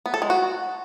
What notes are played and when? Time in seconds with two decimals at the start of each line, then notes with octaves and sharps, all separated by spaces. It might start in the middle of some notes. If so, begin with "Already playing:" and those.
0.06 B3
0.14 A4
0.22 G#3
0.30 F#4